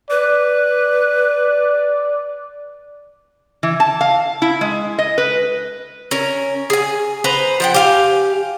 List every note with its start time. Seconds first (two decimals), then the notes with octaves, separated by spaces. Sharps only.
0.10 B4 D5
3.63 E3
3.80 A5
4.01 F5
4.42 E4
4.61 G#3
4.99 D#5
5.18 B4
6.11 C#4 A#4
6.70 G#4 G#5
7.24 B4 C5 A#5
7.60 F3 F#5 G5
7.74 G4 F5 G#5